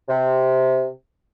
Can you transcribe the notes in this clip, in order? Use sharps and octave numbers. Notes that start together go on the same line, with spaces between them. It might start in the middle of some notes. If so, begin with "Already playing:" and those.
C3